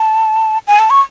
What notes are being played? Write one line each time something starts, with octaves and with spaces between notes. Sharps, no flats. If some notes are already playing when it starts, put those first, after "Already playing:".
Already playing: A5
G#5
A5
C#6